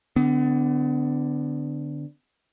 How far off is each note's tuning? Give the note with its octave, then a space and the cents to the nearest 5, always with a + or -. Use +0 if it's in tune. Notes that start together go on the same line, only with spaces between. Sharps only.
D3 +0 B3 +35